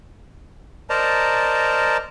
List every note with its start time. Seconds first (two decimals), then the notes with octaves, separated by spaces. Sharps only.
0.90 A#4 C5 D5 D#5 A5 A#5